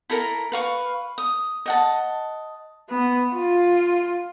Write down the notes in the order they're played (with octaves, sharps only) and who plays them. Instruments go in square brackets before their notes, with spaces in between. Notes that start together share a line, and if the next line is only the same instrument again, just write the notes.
[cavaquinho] E4 A4 A#4 A#5
B4 F5 C#6
D#6
D#5 F#5 A5
[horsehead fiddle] B3
F4